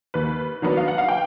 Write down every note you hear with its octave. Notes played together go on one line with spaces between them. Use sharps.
D#2 B4
D#3 F#3 B3 D4
F5
F#5
F5
G5